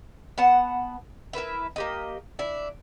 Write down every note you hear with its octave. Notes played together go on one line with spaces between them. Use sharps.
B3 F#5 A5
E4 A#4 B4 E5
A#3 G4 D#5
D4 E4